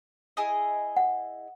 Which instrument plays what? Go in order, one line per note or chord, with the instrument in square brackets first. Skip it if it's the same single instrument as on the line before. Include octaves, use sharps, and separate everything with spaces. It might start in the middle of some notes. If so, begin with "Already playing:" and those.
[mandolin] E4 G#4 D#5
[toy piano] F#5